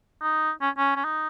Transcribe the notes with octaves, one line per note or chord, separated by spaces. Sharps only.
D#4
C#4
C#4
C#4
D#4